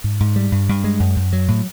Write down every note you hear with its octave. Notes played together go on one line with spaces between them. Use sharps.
G#2
G#2
G3
G2
G2
G#3
F#2
F#2
F#3
A2